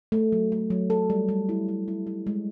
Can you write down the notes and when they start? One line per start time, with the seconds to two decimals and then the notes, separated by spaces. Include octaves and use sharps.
0.12 A3
0.32 F#3
0.52 A3
0.70 F#3
0.90 A4
1.10 G3
1.29 G3
1.49 E4
1.68 E4
1.88 E4
2.07 E4
2.27 G#3